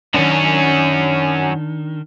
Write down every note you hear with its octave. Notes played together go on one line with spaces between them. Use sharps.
F#2 D#3 C#4 D4